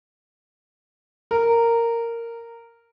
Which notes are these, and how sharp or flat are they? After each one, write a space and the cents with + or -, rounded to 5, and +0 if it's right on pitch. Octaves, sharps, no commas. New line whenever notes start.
A#4 -10